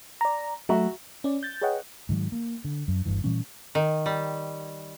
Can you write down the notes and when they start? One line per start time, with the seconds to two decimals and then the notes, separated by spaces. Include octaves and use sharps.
0.21 D5 A#5
0.69 F#3 A3 F#4 E5 A#5
1.24 C#4 D5
1.43 G6 A6
1.62 G#4 B4 C#5 D#5 F#5 G5
2.09 G#2 D#3 F#3
2.32 A#3
2.64 D3
2.88 F#2
3.05 G1 D2 G2 E3
3.24 A#2 E3 G3 C#4
3.75 D#3
4.06 G3